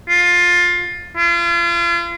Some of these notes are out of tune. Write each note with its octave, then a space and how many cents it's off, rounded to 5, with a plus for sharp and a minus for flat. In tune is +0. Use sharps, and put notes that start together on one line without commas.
F4 +15
F4 -40